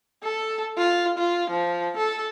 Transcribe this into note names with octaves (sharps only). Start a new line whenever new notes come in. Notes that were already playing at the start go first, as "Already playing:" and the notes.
A4
F4
F4
F3
A4